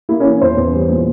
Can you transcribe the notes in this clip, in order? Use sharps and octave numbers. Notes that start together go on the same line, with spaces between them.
A#3 E4
C#4
E3
E2 C5
E2
G3
A#2